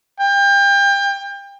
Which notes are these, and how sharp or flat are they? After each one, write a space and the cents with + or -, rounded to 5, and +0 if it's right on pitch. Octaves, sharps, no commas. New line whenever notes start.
G5 +30